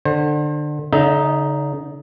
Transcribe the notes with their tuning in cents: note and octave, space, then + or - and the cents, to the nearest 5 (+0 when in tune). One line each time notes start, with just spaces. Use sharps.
D3 +25 C5 +35
D3 -45 D#4 +0 E5 -35